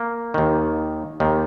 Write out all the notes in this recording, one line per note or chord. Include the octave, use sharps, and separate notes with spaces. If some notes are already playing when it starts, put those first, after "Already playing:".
Already playing: A#3
D#2 D#3
D#2 D#3